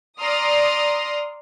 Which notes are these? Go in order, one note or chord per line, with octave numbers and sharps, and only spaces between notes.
D5 A#5 C6 D#6 F6